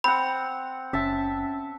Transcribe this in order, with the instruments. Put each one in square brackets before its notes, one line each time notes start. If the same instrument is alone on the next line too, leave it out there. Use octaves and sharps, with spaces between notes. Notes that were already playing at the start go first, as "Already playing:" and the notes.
[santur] C4 F#5 [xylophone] B5
[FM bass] F#1 [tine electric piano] C#4 [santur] E5 A5